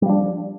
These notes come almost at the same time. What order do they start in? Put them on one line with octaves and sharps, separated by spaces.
G3 F3 D4